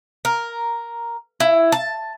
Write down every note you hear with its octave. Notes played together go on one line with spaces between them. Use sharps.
A#4
E4
A5